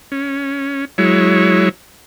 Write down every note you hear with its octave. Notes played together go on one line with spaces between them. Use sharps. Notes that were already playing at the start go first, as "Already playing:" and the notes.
C#4
F#3 G#3 E4 C#5